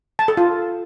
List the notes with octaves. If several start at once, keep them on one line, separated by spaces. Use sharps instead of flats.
A5
A4
F4